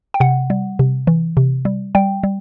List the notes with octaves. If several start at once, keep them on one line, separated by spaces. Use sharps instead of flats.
G5
C3 F#5
G3
C3
E3
C3
G3
G3 G5
G3